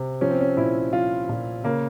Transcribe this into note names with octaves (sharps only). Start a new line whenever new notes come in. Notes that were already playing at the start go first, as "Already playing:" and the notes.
Already playing: C3
F3 C#4
C4
C#4
A#2 E4
F3 F4
A#2
C#3 A#3